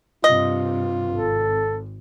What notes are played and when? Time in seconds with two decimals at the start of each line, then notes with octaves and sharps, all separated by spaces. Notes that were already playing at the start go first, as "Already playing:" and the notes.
0.24 G2 C3 F4 D#5
1.12 G#1 A4